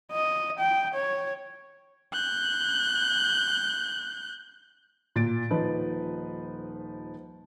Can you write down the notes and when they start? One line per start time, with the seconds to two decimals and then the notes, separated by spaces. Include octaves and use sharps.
0.12 D#5
0.59 G5
0.94 C#5
2.13 F#6 G6
5.16 A#2 A6 D7
5.50 D#1 F3 D#4 B4